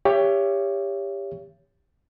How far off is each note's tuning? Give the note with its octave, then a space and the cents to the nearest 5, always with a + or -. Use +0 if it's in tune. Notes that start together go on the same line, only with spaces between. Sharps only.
G4 +20 C#5 +15 E5 +35